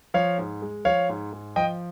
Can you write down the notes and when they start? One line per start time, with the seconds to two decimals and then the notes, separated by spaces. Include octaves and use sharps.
0.14 F3 C#5 F5
0.38 G#2
0.62 G#3
0.85 F3 C#5 F5
1.09 G#2
1.32 G#2
1.56 F3 D#5 G5